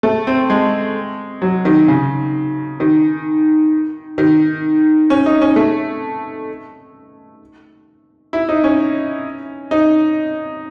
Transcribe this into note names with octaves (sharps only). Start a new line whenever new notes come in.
A3
C4
G#3
F#3
D#3
C#3
D#3
D#3
C#4
D#4
C#4
A3
E4
D#4
C#4
D#4